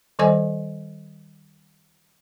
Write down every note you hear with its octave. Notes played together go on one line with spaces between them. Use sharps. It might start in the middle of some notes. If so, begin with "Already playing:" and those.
D#3 G3 A4 C5 D#5 G#5